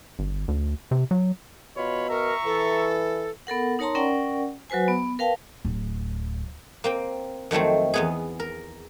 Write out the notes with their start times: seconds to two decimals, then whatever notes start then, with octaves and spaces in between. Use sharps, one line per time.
0.19 G1
0.48 D2
0.91 C3
1.11 F#3
1.77 B2 F4 C#5 B5
2.09 A#4 E5 A#5 C#6
2.45 E3 A4
3.47 B3 A4 A#4 F#5
3.79 D#4 A#4 C#5 A5 A#5 C6
3.95 C#4 A#4 D5 F#5 G5
4.70 F#3 F#4 B4 C5 G#5
4.88 B3
5.19 A#4 B4 F5 G5 A5
5.65 D1
6.84 A#3 C4 G5
7.51 F2 D#3 F#3 A3 C4
7.94 E2 B3 G#4
8.40 A#4